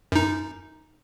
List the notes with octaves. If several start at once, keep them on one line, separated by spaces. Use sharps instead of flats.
F#2 D#4